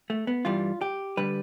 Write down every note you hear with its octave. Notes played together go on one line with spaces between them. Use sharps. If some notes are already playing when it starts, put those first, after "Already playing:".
A3
B3
G2 E3 G3 F4
G4
D3 G3 B4